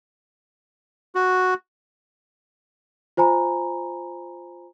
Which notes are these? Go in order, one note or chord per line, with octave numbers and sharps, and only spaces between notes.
F#4
F4 C5 G#5 A#5 B5